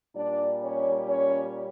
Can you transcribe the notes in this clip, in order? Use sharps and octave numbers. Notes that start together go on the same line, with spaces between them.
A#2 G3 D4 D5
C#4 C#5
C#4 C#5